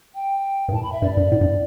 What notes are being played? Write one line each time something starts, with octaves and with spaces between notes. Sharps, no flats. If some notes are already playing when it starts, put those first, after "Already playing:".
G5
G2
A2 A5
B5
E5
G2 D5
G2
A2
G2